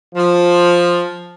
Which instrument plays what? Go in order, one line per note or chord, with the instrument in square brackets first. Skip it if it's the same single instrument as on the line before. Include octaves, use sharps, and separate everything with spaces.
[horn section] F3